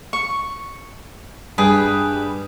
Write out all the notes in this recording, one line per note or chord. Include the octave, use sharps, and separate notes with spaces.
C#6
G2 G3 G#4 B4 G5